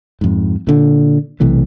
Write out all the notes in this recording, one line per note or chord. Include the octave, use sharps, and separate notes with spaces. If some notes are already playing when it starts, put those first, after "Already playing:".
F2 G#2
A#2 D3
B1 C3 E3 A3